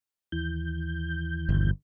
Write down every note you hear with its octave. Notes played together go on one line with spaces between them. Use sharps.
D#2 E3 G6
G1